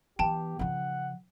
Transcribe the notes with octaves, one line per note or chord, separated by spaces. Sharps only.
E3 B3 G4 G5 A5
C#3 F3 F#5